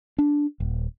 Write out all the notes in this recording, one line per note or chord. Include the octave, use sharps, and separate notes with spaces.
D4
D#1